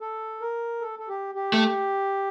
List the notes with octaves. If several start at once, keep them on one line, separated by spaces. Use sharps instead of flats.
A4
A#4
A4
A4
G4
G4
A3